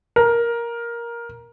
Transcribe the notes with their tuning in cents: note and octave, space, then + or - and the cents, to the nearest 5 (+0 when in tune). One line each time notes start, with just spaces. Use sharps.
A#4 +10